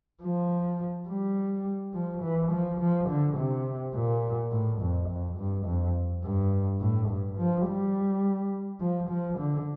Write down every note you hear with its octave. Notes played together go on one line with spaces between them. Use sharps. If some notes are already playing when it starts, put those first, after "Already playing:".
F3
G3
F3
E3
F3
F3
D3
C3
A#2
A2
F2
F2
G2
F2
G2
A2
G2
F3
G3
F3
F3
D3